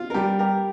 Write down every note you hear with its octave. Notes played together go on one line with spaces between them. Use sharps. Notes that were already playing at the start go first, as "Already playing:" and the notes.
Already playing: F4
A#4
G3 G4
G4 A#4